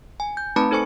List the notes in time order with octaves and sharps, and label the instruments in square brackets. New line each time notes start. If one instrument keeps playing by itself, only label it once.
[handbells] G#5
G6
A3 C4 D#4 B4 A5 B5
D#4 A4 C5 G#5 C#6 C#7